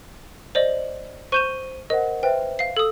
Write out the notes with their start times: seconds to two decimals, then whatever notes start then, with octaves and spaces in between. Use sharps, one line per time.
0.55 C5 D5 D#5 F#7
1.32 C5 C#6 G6 D#7 E7 G7
1.90 A#4 C5 D#5 F#5
2.23 B4 C5 E5 G5
2.59 F5 C7
2.77 A4 D#6 E6